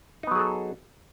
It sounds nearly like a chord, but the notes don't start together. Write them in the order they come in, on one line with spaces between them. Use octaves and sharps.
D#4 B3 F#3 G#4 A4